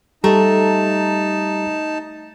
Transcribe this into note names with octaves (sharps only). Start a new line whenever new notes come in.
G3 A3 D#4 G4 A5 A#5